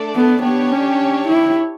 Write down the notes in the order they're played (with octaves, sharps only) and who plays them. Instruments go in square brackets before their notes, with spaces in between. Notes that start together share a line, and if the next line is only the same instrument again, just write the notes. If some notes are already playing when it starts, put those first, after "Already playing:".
Already playing: [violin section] A3 D4 A4 D5
[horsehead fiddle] B3
[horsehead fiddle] B3 [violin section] D4 G4 C#5
[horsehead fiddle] C#4
E4